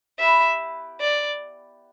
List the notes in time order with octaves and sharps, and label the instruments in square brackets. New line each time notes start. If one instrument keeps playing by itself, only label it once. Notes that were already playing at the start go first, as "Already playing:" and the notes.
[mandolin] B3 E4 G4 B4 [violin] E5
[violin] D5